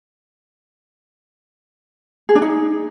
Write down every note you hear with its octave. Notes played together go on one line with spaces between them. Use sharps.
G#4
D4
D#4